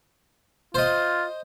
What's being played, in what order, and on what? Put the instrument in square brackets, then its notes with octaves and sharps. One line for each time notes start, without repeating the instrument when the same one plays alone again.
[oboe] F4 [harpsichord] C5 D#5